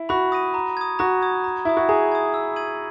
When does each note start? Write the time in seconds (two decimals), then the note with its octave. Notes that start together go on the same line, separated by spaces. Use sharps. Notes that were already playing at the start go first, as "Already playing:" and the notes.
Already playing: E4
0.09 F#4 B5
0.32 D#6 A#6 D#7
0.54 A#5
0.77 D#6 G#6
0.99 F#4 A#5
1.22 D#6 G#6
1.44 A#5
1.65 E4 D#6 G#6
1.77 F#4
1.89 G#4 A#5
2.12 D#6 G#6
2.34 E6
2.56 G#6 D#7 F#7